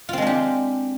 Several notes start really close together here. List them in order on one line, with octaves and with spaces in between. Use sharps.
F4 C4 G#3 D4 G4